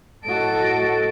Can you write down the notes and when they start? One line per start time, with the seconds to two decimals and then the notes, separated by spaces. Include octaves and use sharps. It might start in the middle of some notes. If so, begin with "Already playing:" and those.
0.24 A2 F#4 A4 D#5 D7